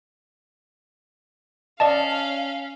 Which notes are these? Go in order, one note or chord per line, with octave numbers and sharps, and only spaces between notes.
C#4 D5 D#5 F5 A5